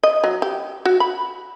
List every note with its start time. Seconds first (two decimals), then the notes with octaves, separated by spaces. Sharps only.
0.03 D#5
0.24 F#3
0.42 G4
0.85 F#4
1.00 B5